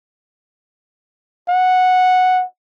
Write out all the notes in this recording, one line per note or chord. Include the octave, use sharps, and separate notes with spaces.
F#5